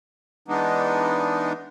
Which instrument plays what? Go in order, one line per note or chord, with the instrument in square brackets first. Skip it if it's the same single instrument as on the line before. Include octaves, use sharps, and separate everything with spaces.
[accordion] E3 G#3 B3 D4 D#4